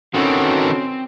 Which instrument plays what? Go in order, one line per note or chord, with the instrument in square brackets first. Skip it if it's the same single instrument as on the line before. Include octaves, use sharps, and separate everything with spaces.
[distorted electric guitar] D#3 E3 [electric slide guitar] C4 [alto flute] C#4 [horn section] F#4 A4